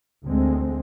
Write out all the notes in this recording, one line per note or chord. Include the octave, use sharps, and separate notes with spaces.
D2 G#3 C4